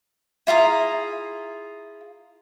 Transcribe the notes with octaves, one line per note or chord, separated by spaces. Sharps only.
E4 F4 G#4 A#5